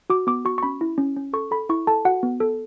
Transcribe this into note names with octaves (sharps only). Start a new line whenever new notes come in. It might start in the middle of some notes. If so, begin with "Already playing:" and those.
F#4 D6
B3 D6
F#4 C#6
C#6
C#4 B5
E4
C#4
C#4
A4 C#6
A4 B5
E4 C#6
A4 A5
F#4 F#5
B3
A4